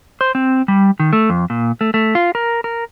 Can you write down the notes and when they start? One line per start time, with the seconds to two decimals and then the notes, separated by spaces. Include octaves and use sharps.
0.21 C5
0.35 C4
0.68 G3
1.00 D#3
1.13 A3
1.30 F2
1.50 A#2
1.81 A3
1.94 A3
2.15 F4
2.35 A#4
2.64 A#4